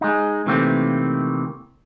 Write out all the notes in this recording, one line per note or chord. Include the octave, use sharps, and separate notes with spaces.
G#3 D#4
C3 D#3 E3 A3 A#3 C4